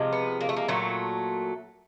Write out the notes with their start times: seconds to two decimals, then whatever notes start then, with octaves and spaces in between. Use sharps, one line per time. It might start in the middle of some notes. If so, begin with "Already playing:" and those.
Already playing: C3 F3 G#3
0.13 B3
0.41 A#3
0.49 A3
0.56 A#3
0.68 A#2 F#3 A3